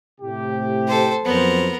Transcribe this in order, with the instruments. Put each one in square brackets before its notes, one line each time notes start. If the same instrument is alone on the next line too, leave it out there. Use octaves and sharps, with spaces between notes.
[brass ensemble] A2 C3 G4
[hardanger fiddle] A4 C5
[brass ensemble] F2 F#3 C5 [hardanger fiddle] B3 A#4